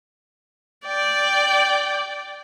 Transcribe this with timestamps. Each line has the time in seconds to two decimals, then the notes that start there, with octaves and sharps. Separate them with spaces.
0.87 D5 G5